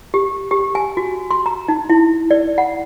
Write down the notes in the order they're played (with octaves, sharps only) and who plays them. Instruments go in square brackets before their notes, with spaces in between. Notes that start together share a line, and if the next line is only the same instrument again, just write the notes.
[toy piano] G4
G4
G#5
F#4
C6
A#5
D#4
E4
D5
F#5